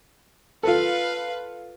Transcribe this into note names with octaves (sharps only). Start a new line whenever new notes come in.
F4 A4 B4 F5